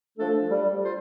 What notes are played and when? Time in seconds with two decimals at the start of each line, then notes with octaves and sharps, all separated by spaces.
0.16 F3 A3 D4 A4
0.50 G3
0.82 F4 C5